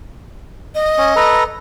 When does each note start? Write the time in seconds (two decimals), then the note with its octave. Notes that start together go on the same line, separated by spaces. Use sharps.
0.75 D#5
0.98 C#4
1.16 A4 B4 A#5